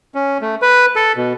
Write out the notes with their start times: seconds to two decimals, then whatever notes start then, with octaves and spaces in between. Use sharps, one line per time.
0.15 C#4
0.41 A3
0.62 B4
0.96 A4
1.16 B2